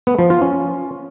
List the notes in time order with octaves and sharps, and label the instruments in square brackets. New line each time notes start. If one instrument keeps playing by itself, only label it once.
[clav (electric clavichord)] B3
F3
F4
C#4